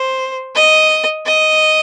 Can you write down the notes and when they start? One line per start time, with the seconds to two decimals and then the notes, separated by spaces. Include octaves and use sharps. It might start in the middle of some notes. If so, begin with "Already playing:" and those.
Already playing: C5
0.55 D#5
1.26 D#5